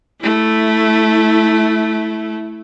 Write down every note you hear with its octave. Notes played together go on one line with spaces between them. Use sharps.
A3 E4